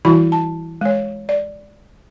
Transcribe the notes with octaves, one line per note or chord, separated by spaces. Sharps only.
E3 G3 E4 F#4 B5
A5
G#3 C#5
D5